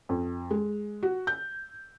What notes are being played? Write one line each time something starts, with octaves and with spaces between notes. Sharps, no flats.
F2
G#3
F#4
G6